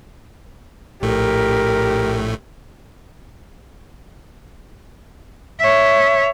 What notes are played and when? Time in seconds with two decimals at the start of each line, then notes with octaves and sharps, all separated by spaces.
1.02 A#1 A2 A3 G4 A#4
5.60 C#5 E5